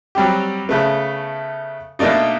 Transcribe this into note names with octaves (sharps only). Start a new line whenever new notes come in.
F#3 G3 C4 G4
C#3 A3 B3
B2 A3 A#3 D4 D#4